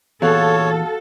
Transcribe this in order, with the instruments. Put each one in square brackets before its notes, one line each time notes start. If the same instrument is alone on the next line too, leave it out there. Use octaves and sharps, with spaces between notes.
[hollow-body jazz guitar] E2 A#2 [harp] F#4 F5 F#5 [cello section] A4 [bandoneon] C#5